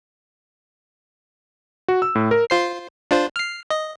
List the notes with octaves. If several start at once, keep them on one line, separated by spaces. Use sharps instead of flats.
F#4
E6
A2
A#4
F4 C5 C7
D4 F4 C5
F6 C7
D#5